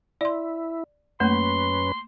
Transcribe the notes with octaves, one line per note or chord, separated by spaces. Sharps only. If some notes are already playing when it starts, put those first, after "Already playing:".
E4 D5 C6
F#2 A3 A#3 C#4 B4 C6